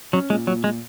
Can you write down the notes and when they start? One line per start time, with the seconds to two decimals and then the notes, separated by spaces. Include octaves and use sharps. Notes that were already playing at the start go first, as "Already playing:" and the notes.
0.13 F#3 C#4
0.30 A#2 G#3
0.47 A#2 F#3
0.64 A#2 G#3